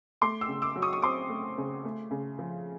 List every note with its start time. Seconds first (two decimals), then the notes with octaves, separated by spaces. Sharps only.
0.21 A3 C6 D6
0.41 D6 E6
0.48 C#3
0.62 D6 E6
0.76 F#3
0.82 C#6 D#6
0.93 C#6
1.02 C4 C6 D6
1.30 A3
1.58 C#3
1.85 A3
2.11 C#3
2.39 F3